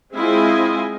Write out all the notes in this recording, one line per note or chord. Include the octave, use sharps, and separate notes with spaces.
G#3 C4 E4 F4 D#5 G#5